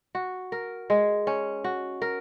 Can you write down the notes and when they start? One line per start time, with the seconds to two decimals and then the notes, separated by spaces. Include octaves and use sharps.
0.15 F#4
0.52 A#4
0.90 G#3
1.27 C#4
1.64 F#4
2.02 A#4